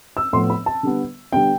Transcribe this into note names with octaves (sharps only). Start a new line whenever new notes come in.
E6
A2 F3 B3 C6
B5
A5
D3 G3 B3
D3 G3 B3 G5